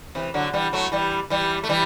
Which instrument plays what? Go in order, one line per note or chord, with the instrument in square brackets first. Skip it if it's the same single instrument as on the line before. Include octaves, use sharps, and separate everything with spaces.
[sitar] C3 E3
D3 F#3
E3 G3
F#3 A3
E3 G3
E3 G3
A3
E3 G3